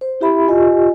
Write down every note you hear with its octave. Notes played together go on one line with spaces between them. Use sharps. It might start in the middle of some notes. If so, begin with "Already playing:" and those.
C5
E4 G4 E5 B5
F4 G4 D#5 G#5